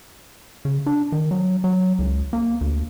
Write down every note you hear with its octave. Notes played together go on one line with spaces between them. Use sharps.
C#3
D4
D#3
F#3
F#3
C#2
A#3
D2